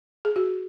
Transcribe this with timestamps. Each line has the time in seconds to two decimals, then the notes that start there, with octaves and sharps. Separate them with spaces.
0.25 G#4
0.36 F#4